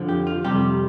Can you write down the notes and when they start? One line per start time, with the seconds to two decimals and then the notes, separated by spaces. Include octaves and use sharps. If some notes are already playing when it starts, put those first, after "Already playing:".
Already playing: F2 D3 F3
0.09 G4
0.27 F4
0.44 F2 C3 G3 G4